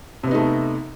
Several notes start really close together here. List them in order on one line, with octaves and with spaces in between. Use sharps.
C3 B3 D#4 A3